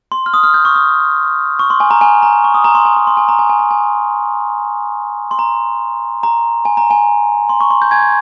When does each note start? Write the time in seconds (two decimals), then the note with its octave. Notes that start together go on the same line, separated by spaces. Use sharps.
0.12 C6
0.26 F6
0.34 D#6
0.43 F6
0.54 G6
0.65 C#6
0.75 D#6
1.59 C#6
1.70 C6
1.80 G#5
1.91 A#5
2.01 G#5
2.22 A#5
2.44 C#6
2.54 D#6
2.64 A#5
2.75 C6
2.85 G#5
2.97 A#5
3.07 C6
3.17 G#5
3.29 A#5
3.39 G#5
3.49 G#5
3.60 A#5
3.71 G#5
5.31 C6
5.39 A#5
6.23 A#5
6.65 G#5
6.77 A#5
6.91 G#5
7.49 C6
7.61 C#6
7.71 C6
7.82 G6
7.91 G#5 G#6